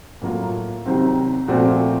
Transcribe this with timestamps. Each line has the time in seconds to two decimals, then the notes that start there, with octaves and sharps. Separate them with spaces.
0.22 A2 F#3 A#3 F4
0.86 C2 C3 D#3 F#3 C4
1.48 A#2 F3 A3 C4 F#4